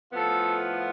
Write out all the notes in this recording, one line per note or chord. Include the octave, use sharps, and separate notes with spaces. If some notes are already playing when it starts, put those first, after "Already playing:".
A2 F3 B3 F4 A4